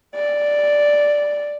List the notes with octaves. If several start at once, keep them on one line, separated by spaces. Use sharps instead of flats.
D5